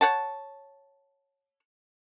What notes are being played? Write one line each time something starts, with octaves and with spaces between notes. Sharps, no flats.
C#5 F#5 A5